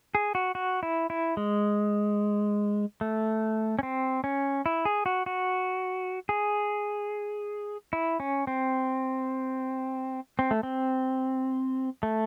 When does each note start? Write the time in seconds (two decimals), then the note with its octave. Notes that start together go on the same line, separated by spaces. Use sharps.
0.15 G#4
0.35 F#4
0.55 F#4
0.83 E4
1.10 E4
1.37 G#3
3.01 A3
3.79 C#4
3.83 C4
4.24 C#4
4.66 E4
4.85 G#4
5.06 F#4
5.26 F#4
6.29 G#4
7.93 E4
8.20 C#4
8.47 C4
10.39 C4
10.51 A3
10.63 C4
12.03 A3